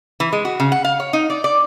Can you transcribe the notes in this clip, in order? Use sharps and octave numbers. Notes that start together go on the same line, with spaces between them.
E3
G#3
F#4
C#3
F#5
F5
C#5
D#4
D5
D5